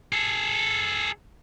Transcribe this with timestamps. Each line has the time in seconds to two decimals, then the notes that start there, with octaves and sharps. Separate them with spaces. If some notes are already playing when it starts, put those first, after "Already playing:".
0.13 G#4 A4